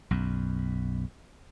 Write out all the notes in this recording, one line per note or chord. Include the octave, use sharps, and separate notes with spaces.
B1 F#2